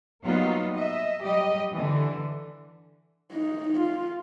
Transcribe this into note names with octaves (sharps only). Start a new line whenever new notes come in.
F#3 G3 A#3 B3 D#4 F4
D#5 E5
F#3 G3 G4 D#5
D3 E3
D#4
F4